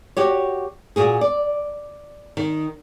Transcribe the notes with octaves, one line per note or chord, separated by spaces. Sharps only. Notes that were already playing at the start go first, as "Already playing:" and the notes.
F#4 G4 C#5
A#2 F#4 G#4
D5
D#3